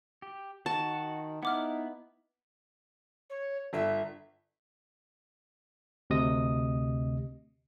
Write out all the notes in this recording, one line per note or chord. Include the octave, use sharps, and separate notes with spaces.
G4
D#3 F#4 A5
B3 D#4 E4 F#5 D6 F6
C#5
G1 E5
D2 C3 D#5 D#6